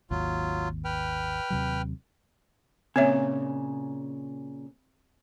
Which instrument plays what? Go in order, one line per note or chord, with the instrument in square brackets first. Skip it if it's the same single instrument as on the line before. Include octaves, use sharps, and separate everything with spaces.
[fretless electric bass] G#1 D#2 [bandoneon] F#3 F4
[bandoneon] B4 G5 F6
[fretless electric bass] D#2 C3 F#3
[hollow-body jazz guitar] A#2 C#3 [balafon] C4 C#5 E5